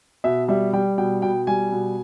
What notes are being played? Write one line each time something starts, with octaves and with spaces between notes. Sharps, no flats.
B2 E5
G3 E5
G3 G5
B2 G5
B2 G5
G3 G#5
B2